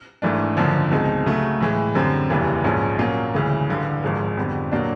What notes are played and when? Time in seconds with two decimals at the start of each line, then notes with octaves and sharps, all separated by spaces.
0.22 G#1 G#2 E3 A3 D4
0.57 F#1 F#2 D3 F3
0.91 C#2 B2 G#3 C4 D#4
1.26 C#3 F#3 A3
1.61 A2 E3 G#3
1.95 F#2 D3 G3 C4
2.30 F1 D#2 C#3 E3 G3
2.64 A#1 G#2 F3 G#3 C#4
2.99 A#2 F#3 A#3 C#4 F4
3.34 D2 C#3 E3 G#3
3.68 A1 G2 D3
4.03 G#1 G#2 F3 G#3
4.37 F2 D3 G3 B3
4.71 A#2 F#3 A#3 D4